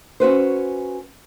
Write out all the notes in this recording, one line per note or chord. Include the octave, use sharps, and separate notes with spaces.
C#4 F#4 B4 C5